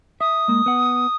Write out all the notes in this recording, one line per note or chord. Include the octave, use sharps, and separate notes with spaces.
E5 D#6
G#3 A#3
B3 F#5